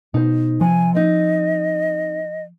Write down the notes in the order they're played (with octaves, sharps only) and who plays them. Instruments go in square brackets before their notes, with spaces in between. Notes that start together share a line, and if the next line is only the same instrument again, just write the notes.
[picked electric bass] B2 [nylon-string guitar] D#4 C5
[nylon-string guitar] C3 [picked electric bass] F3 [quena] G#5
[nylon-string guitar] C4 D#4 [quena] D#5